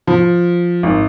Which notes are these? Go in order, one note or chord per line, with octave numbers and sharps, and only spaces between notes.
F3
G#1